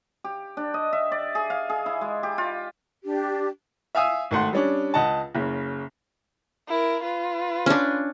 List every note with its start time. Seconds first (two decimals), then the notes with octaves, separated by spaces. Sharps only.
0.24 G4
0.57 D4
0.74 D#5
0.93 E5
1.12 D5
1.35 G#4
1.50 F5
1.70 G#4
1.86 E4
2.01 G#3
2.23 G4
2.38 F4
3.05 D4 G4
3.95 E5 F5 G#5 D#6 E6
4.31 G#1 A3 F#5 C6
4.53 G3 C#4 D4
4.94 C#2 D#5 F#5 A5
5.35 F#1 C#3
6.68 E4 A#4
7.04 F4 B4
7.66 C#4 D4